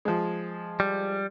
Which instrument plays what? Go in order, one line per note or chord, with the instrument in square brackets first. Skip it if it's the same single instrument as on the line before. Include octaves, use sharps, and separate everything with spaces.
[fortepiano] F3 G#3
[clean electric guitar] G3